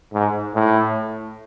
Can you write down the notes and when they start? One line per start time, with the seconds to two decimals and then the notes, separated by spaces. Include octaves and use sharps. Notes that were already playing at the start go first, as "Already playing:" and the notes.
0.13 G#2
0.54 A2